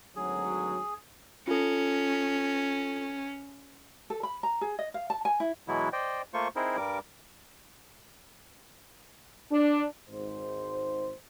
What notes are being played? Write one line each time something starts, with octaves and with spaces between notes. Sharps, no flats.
G#1 D2 F#3 G#4
C#4 F4 A4
A4
B5
A#5
G#4
D#5
F5
A5
G#5
E4
B2 E3 F#3 G#3 B3 E4
C5 D5 D#5 G5
A3 A#3 F4 C5 C#6
C4 D#4 E4 G#4 A#4 C5
G2 G3 A#4 D6
D4
G#1 G#2 C5